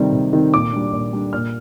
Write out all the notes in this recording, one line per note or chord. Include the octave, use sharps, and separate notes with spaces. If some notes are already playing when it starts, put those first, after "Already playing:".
Already playing: C3 D#3 G3 C4
C3
D#3 G3 C4
A#2 D6
G3 D4
A#2
G3 D4
A#2 F6